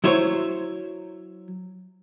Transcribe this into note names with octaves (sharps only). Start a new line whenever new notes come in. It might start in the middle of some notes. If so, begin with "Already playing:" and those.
F#3 E4 C5 C#5